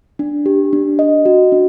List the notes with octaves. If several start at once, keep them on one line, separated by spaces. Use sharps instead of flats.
D4
G4
D4
D#5
F#4
D4